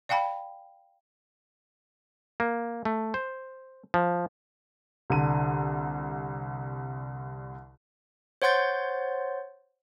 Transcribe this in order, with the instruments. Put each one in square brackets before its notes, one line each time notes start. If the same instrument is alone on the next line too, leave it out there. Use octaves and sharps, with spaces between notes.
[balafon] D5 F5 G5 A5 B5
[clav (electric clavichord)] A#3
A3
C5
F3
[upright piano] C2 D3 D#7
[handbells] C5 C#5 F#5 C6 G6 A6